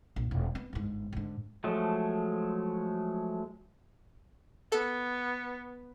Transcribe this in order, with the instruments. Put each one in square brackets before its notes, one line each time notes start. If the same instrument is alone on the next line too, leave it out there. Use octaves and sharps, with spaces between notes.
[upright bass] A#1
E1
B3
G1 G#2
G#2 D3
[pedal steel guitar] F3 F#3 G#3 A3
[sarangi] B3 [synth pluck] A4